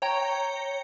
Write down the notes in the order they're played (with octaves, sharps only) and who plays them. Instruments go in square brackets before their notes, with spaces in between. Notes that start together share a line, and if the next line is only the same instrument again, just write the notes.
[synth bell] C#5 G5 A#5